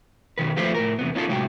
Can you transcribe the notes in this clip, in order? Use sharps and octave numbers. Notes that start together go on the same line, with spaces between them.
B2 D#3 B4
F3 A3 F4 B4 C5
A2 A#4
E2 C3 B3
B3 C#4 D#4 F4 F#4 A4
A2 C3 F#3 G#3 G5